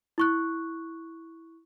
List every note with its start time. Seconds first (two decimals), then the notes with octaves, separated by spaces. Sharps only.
0.18 E4 C#6 F#6